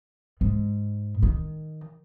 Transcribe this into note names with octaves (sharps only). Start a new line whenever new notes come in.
G#2
D#3